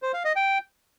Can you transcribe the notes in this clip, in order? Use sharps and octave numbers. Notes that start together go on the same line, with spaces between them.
C5
F5
D#5
G5